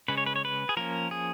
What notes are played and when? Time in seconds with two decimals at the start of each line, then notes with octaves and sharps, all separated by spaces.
0.08 C#3 G#3 C#4 B4
0.17 C#5
0.26 B4
0.36 C#5
0.45 B4
0.69 G#4
0.77 F3 A#3 C#4 A#4
1.11 G#4